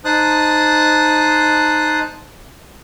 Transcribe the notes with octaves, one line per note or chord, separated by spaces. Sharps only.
D#4 C5 A5 D#6 F#6